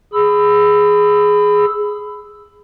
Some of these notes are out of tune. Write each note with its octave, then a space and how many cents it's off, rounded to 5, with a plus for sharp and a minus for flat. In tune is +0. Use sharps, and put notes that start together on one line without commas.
G#4 +0 B5 +20 E6 +0